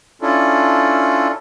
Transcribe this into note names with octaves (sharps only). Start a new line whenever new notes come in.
C#4 D4 E4 F4 A4